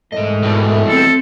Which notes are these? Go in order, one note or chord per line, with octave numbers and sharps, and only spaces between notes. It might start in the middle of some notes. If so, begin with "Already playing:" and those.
C2 G#2 E3 A3 D#5
E2 B2
C4 A4